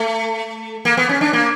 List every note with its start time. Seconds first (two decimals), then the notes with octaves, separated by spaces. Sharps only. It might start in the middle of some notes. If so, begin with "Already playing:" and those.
Already playing: A3
0.85 A#3
0.97 B3
1.09 C#4
1.21 D4
1.33 A#3